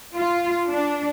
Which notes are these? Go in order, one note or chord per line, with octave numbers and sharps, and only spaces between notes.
F4
D4